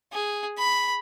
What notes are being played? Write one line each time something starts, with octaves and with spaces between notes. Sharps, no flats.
G#4
B5